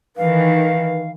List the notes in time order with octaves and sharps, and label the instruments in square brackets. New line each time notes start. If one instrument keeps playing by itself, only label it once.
[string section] D#3 E3 [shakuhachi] B4 [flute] F5